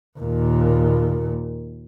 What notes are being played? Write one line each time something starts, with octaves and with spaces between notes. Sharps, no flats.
D#2 A#2